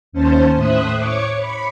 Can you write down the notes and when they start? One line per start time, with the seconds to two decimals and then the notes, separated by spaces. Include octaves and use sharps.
0.12 D#2 C#4 C5 A5
0.55 A2 C5 E5 D#6 F#6
0.96 C#5 C#6 D6
1.38 B5 C#7